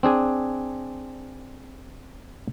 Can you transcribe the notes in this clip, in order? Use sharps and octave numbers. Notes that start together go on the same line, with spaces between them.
C4 D4 G#4 G#5